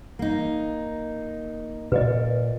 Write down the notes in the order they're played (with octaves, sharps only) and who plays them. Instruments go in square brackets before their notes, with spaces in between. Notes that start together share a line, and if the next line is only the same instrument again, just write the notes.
[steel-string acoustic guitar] A#3 D#4
[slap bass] A#2 [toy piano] B4 D#5